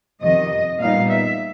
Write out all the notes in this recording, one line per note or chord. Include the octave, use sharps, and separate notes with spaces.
F2 C3 D#3 D#5
A#2 G3 B3 D#4 F5
E5